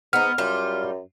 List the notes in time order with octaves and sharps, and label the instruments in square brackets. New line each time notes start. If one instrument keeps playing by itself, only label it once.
[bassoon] G#2 [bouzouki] B3 D#4 [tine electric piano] F6
[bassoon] F#2 [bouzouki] G3 F4